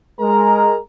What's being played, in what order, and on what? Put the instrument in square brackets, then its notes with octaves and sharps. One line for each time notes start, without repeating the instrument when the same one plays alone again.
[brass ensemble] G#3 A#4 A#5